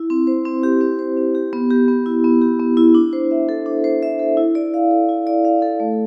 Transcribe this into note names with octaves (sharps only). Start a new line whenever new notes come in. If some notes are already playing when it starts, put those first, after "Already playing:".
Already playing: E4
C4
C5
C4
G4
C4
C5
C4
G4
B3
G4
B3
E4
B3
G4
B3
E4
D4
C5
E5
A4
D4
C5
E5
A4
E4
D5
F5
A4
E4
D5
F5
A4
A3